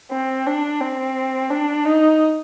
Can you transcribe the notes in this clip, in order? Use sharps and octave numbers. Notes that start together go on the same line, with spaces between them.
C4
D4
C4
D4
D#4